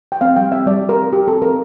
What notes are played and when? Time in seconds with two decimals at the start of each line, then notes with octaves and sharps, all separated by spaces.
0.12 G5
0.21 C4 F5
0.36 G3 G5
0.52 C4 E5
0.66 G3 D5
0.81 G4
0.89 A#4
0.97 C4
1.13 G4
1.28 C4 A4
1.42 C4 A#4